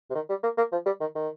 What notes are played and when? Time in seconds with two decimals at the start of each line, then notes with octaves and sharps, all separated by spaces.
0.10 C3
0.15 D#3
0.30 G3
0.43 A#3
0.57 A#3
0.72 F3
0.86 G3
1.01 D#3
1.15 D#3